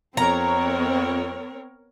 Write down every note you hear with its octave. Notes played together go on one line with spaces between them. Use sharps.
F2 B3 C4 A#4 C#5 A#5